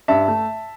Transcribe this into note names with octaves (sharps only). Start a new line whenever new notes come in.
G2 E5 A5
A3